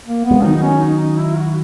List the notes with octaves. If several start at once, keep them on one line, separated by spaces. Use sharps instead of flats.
A#3
B3
G#3
D#3 F#3 D#4
D#4
C#4
D#4
D#4
E4
F#4